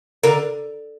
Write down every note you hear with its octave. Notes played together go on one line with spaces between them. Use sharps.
D3 A#4